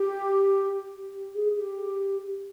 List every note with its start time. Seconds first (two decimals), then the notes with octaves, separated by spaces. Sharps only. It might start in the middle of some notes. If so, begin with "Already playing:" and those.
Already playing: G4
0.98 G4
1.34 G#4
1.52 G4